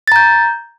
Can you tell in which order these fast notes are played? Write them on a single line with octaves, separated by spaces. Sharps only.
A6 A#5 G6